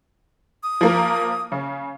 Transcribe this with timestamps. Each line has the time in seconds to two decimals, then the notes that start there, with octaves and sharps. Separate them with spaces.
0.63 D#6
0.81 F3 A#3 A#4
1.52 C#3